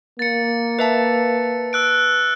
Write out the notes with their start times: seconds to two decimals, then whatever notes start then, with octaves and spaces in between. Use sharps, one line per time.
0.19 A#3 A6 C#7
0.79 B4 E5 A5
1.73 E6 F#6 D7